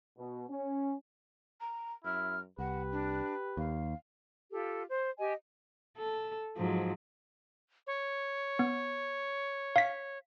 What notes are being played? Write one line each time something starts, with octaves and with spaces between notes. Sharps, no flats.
B2
C#4
A#5
F#2 E4 F6
C2 G4 B4 F#5
D4
D#2 F5
F4 G4 A4
C5
G4 D#5 G#5
A4
G#2 F3 F#3
C#5
B3
F5 B6